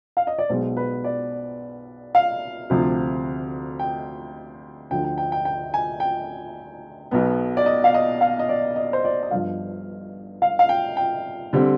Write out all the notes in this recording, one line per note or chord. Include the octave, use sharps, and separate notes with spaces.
F5
D#5
D5
B1 B2 G#3 C5
B4
D5
F5
D2 C3 F3
G5
D2 D3 F3 G5
G5
G5
G5
G5
G#5
G5
B1 B2 B3
D5
D#5
F5
D#5
F5
D#5
D5
D#5
C5
D5
D#5
G1 G2 F3 F5
F5
F5
G5
G5
D3 G3 C4